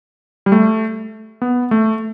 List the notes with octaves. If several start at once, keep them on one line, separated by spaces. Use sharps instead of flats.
G3
A3
B3
A3